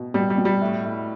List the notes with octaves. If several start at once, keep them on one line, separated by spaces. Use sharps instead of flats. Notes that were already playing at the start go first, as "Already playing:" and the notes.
Already playing: B2
B2 G3
G3
B2
G3
A2
A2